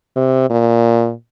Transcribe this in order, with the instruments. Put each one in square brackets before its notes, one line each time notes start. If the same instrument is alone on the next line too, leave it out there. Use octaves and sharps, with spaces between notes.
[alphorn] C3
A#2